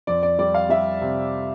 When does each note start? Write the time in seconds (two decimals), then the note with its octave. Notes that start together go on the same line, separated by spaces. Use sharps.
0.07 F2 D5
0.23 D5
0.39 G3 D5
0.55 F5
0.69 G3 E5
1.01 C3